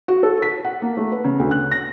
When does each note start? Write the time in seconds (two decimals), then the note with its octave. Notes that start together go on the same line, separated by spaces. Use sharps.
0.08 F#4
0.23 A4
0.42 B6
0.65 F#5
0.82 A#3
0.97 A3
1.12 B4
1.25 C#3
1.39 D2
1.51 F#6
1.72 A#6